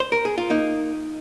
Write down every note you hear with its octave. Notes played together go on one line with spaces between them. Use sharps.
C5
A#4
G#4
F4
A#3 D#4